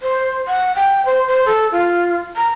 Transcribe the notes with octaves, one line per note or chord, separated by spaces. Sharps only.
C5
F#5
G5
C5
C5
A4
F4
A#5